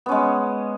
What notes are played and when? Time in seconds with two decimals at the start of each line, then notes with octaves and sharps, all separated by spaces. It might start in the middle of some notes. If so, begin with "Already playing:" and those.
0.06 B3
0.09 C#4
0.11 G#3